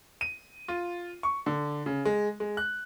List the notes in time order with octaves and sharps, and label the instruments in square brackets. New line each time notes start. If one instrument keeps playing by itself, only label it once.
[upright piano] D#7
F4
C#6
D3
C#3
G#3
G#3
F#6